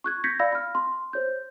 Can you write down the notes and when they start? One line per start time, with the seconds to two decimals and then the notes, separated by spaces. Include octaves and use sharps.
0.04 C#6 F#6 G#6
0.24 G6 G#6 A#6 B6 C#7
0.40 D5 F5 B5 E6 A#6
0.53 B5 F6
0.75 C6
1.13 C5 C#5 G6